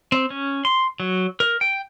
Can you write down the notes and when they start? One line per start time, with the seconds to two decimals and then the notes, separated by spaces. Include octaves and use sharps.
0.12 C4
0.30 C#4
0.65 C6
1.00 F#3
1.40 A#4
1.61 G5